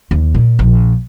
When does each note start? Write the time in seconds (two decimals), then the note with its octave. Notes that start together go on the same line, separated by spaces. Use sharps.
0.11 D#2
0.34 A#2
0.59 A#1